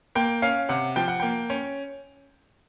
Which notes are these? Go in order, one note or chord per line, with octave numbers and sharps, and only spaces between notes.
A#3 G5
C#4 F5
C3 F#5
F3 G5
F#5
A#3 G5
C#4